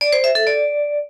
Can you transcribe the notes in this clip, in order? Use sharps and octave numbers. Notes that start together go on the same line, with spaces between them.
D5
C5
E5
A4
D5